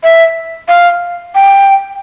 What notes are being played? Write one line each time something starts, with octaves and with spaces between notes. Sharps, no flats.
E5
F5
G5